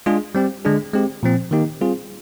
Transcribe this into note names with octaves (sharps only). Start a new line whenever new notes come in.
G#3 D4 F4 G#4
G3 C4 G4
D3 G#3 D4 G#4
G#3 C4 G4
A#2 F3 C4
D#3 A#3 D#4 G4
G3 C4 F4 G#4